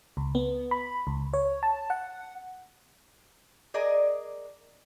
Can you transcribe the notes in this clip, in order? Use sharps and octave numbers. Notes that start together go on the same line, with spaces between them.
C#2
B3
B5
C#2
C#5
A5
F#5
G#4 A#4 D5 D#5